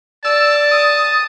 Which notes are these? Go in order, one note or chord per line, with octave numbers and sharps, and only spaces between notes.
D5 A5 E6
D#6